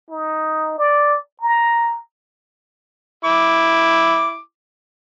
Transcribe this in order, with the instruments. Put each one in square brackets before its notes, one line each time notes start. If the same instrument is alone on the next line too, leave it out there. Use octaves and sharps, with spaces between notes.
[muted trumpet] D#4
D5
A#5
[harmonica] E4 D6